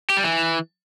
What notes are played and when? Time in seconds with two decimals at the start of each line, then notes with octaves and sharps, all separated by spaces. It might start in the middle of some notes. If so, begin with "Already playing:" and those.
0.10 G4
0.17 G3
0.24 E3